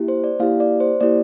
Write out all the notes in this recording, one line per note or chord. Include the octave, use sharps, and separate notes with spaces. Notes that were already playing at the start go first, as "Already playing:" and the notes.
Already playing: A#3 E4 G4
C5
D5
A#3 E4 G4 F5
D5
C5
A#3 E4 G4 D5